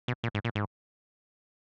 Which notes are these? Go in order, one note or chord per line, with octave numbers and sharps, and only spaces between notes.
B2
A#2
G#2
A#2
G#2